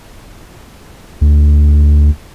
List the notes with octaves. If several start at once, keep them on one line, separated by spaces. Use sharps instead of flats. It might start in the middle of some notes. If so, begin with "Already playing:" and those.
D2